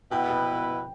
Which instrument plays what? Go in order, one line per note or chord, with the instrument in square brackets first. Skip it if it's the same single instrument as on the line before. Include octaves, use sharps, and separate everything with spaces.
[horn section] B2 B3 E4 B4 [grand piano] G5
[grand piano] G5